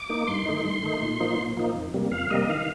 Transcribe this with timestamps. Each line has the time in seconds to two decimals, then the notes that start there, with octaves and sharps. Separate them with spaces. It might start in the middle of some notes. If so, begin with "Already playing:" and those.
Already playing: D6
0.09 A#3 D#4
0.27 G2 C6
0.46 D#3 A3 D#4
0.65 G2
0.83 D#3 A3 D#4
1.02 A#2
1.20 F3 A#3 D#4
1.39 A#2
1.57 F3 A#3 D#4
1.75 F2
1.94 C3 G3 A#3
2.11 F2 F5
2.30 C3 G3 A#3 D#5
2.49 D#3 F5